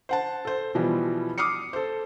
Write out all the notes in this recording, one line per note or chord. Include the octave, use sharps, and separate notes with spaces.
C5 F#5 A5
A4 C5
B2 E3 F3 G3
D6 D#6 F6 C7 C#7
A4 C5